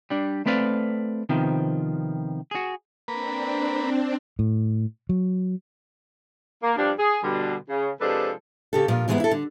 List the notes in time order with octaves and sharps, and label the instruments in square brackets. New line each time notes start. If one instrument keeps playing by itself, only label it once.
[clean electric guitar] G3 D4
A3 C4 B4 D5 F5
C3 D#3 F3 B3
F#4 G#4
[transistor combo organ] A#3 B4 [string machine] C4 D4
[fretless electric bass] A2
F#3
[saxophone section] A#3
G2 F3 G3 D4
G#4
B2 D3 G3
C#3
C3 F3 G#3 D4 A4 B4
[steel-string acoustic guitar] C#3 G4 A4
A#2 F3 F4
G#2 E3 F3 G#3 B3 E4
E4 A4
D3